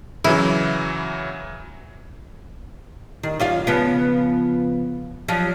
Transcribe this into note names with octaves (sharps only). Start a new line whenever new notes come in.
C#3 E3 F#3 E4
D#3
F#2 F4 F5
C#3 F3 B3
F3 F#3